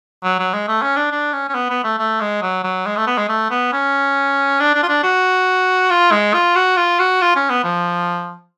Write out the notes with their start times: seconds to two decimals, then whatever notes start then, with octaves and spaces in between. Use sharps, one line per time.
0.24 F#3
0.39 F#3
0.54 G#3
0.68 A3
0.82 C#4
0.96 D4
1.11 D4
1.33 C#4
1.49 C#4
1.54 B3
1.70 B3
1.84 A3
1.98 A3
2.21 G#3
2.42 F#3
2.64 F#3
2.86 G#3
2.97 A3
3.07 B3
3.17 G#3
3.29 A3
3.51 B3
3.72 C#4
4.60 D4
4.74 D4
4.83 F4
4.89 D4
5.03 F#4
5.90 F4
6.12 G#3
6.34 F4
6.56 F#4
6.77 F4
7.00 F#4
7.21 F4
7.36 C#4
7.50 B3
7.64 F3